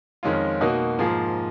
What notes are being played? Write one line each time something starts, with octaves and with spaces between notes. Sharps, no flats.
F2 D#3 G#3 C#4 F4
B2 A#3 D#4 F#4
G#2 F3 A#3 F4 G#4